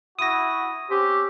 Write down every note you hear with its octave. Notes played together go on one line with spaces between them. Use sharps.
E4 F#4 D#6 A#6
C4 C#4 G4 C5